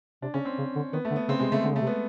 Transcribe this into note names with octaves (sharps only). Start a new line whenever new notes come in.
C3 D4
C#3 C#4
C4
C#3
D3
D#3 B3
A3
D3
B3
C#3 C4
C3 G#3
C#3 A3
D3 G#3
C#3 A3
C3
B3